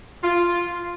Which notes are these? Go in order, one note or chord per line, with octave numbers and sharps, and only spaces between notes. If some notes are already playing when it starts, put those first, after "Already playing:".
F4